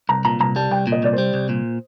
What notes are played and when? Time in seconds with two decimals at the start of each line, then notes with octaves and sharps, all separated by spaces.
0.09 C2 A#5
0.25 A#2 A#5
0.40 C2 A#5
0.56 G3 A5
0.71 C2 G5
0.87 A#2
0.92 D#5
1.03 C2 D5
1.13 C5
1.18 G3
1.34 C2
1.49 A#2